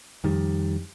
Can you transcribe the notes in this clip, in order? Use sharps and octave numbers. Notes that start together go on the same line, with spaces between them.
F2 D#3 G3